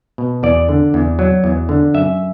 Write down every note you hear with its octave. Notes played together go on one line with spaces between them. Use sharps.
B2
E2 D5
D3
E2
F#3
E2
D3
F#2 E5